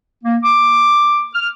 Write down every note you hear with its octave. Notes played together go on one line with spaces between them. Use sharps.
A#3
D6
F6